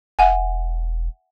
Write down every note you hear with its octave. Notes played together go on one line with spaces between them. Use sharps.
E1 E5 F#5 G#5